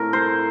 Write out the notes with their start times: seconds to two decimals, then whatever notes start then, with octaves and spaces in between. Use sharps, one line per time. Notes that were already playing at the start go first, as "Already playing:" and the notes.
Already playing: A2 A3 C4 F4 A#4
0.13 C5